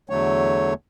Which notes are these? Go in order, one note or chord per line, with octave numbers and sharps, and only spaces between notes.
E2 D3 F#3 A3 C#5